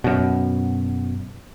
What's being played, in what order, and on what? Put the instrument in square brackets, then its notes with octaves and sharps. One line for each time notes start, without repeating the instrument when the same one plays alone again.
[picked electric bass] F#2 B2